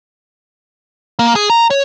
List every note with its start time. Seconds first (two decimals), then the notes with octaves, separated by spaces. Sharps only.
1.19 A#3
1.36 G#4
1.50 A#5
1.70 C#5